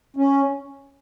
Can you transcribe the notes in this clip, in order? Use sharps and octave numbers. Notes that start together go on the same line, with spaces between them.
C#4